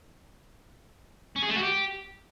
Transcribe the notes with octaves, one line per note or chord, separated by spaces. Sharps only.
C#4
G#4
A3
F#4
G4